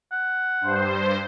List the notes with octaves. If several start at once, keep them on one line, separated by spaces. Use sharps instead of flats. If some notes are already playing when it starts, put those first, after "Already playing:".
F#5
G2 C5